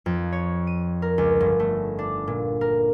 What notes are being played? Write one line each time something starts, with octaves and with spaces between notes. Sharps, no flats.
F2
C#5
D#7
A#4
C#2
G1
A3
D4
A#2
A#4